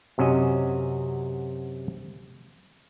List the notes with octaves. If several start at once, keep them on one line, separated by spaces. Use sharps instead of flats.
F#2 C3 C#4 F#4 D#5